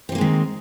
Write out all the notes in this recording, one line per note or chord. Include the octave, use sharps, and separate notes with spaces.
D#3 G3 G#3 A#3 C4